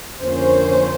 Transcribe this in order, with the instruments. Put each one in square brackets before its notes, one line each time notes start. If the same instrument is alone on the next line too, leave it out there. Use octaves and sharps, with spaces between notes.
[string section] F2 D3 F3 A#3 C#4 C5